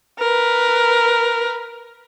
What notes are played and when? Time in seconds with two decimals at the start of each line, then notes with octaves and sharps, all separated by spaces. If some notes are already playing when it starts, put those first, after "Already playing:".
0.20 A#4 B4